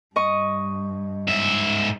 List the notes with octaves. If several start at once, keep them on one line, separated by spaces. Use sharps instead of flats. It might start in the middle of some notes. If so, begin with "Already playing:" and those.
G2 D#5 C#6
G#2 E5